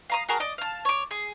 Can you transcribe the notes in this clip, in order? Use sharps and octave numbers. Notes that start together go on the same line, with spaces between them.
F5 A#5 D#6
F#4 G#4 A#4 A5
D5 D#5
F5 A5
C#5 D6
G#4